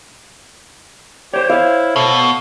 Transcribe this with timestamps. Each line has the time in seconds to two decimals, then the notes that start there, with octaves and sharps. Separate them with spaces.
1.34 G4 C5 C#5
1.49 E4 F5
1.96 B2 A4